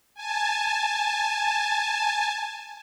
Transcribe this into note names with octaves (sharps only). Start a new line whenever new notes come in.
G#5 A5